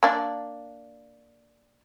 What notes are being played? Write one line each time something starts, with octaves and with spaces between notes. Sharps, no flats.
A#3 D4 D5